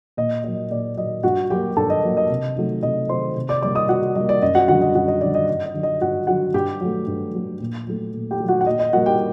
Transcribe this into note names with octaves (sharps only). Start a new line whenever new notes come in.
A#2 D#5
F#3 A#3 D#5
A#2 D5
F#3 A#3 D#5
G2 F#4 F#5
F#3 A#3 G4 G5
G2 A4 A5
D#5
F#3 A#3
D#5
C3
D#3 F#3 A3
C3 D#5
D#3 F#3 A3 C5 C6
C3
D5 D6
G3 A#3 D5 D6
D#5 D#6
C3 F#4 F#5
G3 A#3 D#5
D5
F#2 D#5
F#4 F#5
D3 G3 F#4 F#5
D#5
F#2 F#4 F#5
D#5
D3 G3 D5
D#5
G2 D#5
D#5
D3 F#3
D#5
G2 F#4 F#5
D3 F#3 F#4 F#5
G2 G4 G5
F#3 A3
G2
F#3 A3
A#2
F#3 A3
A#2
G4 G5
F#3 A3
F#4 F#5
F#5
A#2 D#5
D#5
G3 A#3 F#4 F#5
G4 G5